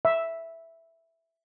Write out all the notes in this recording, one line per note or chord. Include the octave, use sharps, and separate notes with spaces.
E5